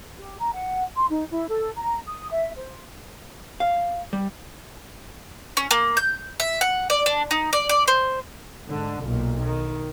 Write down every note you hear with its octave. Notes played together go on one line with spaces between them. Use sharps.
G4
A#5
F#5
C6
D#4
E4
A4
A#5
D#6
E5
C5
F5
G3
C#4
A#3
G6
E5
F#5
D5
D4
D#4
D5
D5
C5
G#2 D3
B1 A#2
D#3